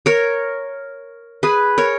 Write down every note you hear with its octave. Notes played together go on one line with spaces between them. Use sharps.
A#4 C#5
G#4 B4
A#4 C#5